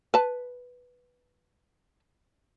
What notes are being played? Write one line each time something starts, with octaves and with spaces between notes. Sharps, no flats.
B4 A5